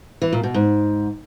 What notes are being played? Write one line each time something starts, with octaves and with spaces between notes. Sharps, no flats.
E3
A#2
B2
G#2